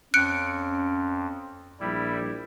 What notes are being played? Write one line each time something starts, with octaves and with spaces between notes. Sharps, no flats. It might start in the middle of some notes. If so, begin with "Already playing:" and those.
F2 C#4 F#6 C#7 D7
A#1 G3 E4